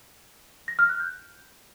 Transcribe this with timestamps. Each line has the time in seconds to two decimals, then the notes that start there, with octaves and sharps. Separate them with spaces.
0.68 A#6
0.79 F6
0.89 F#6
1.00 G6